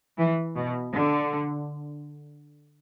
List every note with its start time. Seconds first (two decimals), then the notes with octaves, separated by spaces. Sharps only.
0.18 E3
0.55 B2
0.91 D3